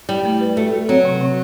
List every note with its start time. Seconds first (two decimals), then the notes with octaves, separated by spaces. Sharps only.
0.09 G3 E4
0.25 A3
0.41 B4
0.57 A3 F#4
0.73 F#4
0.89 F#3 C4
1.05 C3
1.21 C3